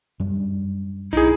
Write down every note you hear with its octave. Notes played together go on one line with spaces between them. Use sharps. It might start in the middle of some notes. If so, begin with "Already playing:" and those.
F#2 G3 D4
B1 D#4 E4 G#4